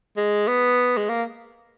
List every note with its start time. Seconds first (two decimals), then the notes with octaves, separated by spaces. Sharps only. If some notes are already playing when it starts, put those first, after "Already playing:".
0.17 G#3
0.48 B3
0.97 G#3
1.09 A#3